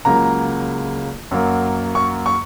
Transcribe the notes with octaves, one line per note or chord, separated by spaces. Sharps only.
C#2 C#3 F#3 A#3 A#5
F#2 F#3 A#3
C#6
C#6